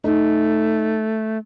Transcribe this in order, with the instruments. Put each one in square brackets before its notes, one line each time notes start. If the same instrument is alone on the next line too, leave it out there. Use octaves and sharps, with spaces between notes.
[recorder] A3 [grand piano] D#4